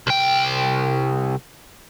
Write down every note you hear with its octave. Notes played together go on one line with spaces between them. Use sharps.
C2 G5